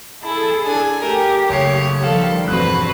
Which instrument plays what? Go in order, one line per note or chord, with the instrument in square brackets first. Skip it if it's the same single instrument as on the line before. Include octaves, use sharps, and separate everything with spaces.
[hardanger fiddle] E4 [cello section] G#4 A4 [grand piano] A5
[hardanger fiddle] D4 G#5
[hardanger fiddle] A3 A#4 [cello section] G4
[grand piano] F#1 A3 C7 [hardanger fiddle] C#5
[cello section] D#3 F3 G3 [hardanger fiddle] A4 [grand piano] F5
[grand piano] E1 F#6 [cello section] G2 F#4 [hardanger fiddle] C4 B4